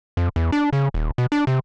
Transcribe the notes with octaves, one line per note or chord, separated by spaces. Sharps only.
F2
E2
D4
C#3
D#1
B2
D4
C3